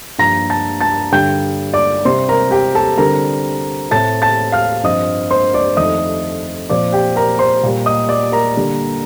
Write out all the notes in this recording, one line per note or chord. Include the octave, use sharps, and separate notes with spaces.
G2 F3 A#3 A#5 A#6
A5 A6
A5 A6
G2 D3 G3 G5 G6
D5 D6
C3 G3 C4 C5 C6
A#4 A#5
G4 G5
A4 A5
D3 G3 C4 A#4 A#5
A2 A3 C4 A5 A6
A5 A6
F5 F6
G2 F3 C4 D#5 D#6
C5 C6
D5 D6
F2 D#3 A3 C4 D#5 D#6
A#2 F3 C4 D5 D6
G4 G5
A#4 A#5
C5 C6
A#2 G3 A#3
D#5 D#6
D5 D6
A#4 A#5
D3 G3 A#3